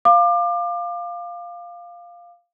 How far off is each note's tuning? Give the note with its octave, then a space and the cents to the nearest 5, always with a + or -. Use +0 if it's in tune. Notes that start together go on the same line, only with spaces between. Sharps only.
F5 +0 D6 +30